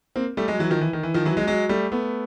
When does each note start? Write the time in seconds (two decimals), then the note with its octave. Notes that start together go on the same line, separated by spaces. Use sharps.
0.16 A#3 C4
0.37 G3 A3
0.48 F#3 G#3
0.59 E3 F#3
0.70 D#3 F3
0.81 E3
0.93 D#3
1.03 E3
1.14 D#3 F3
1.25 E3 F#3
1.37 F#3 G#3
1.47 F#3 G#3
1.69 G3 A3
1.91 A3 B3